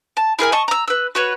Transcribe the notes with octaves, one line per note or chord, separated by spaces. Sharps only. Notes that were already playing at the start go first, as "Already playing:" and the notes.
A5
E4 G#4 A#4 G#5
D#5 A5 C#6
A#5 E6
B4 E6
F#4 B4 C#5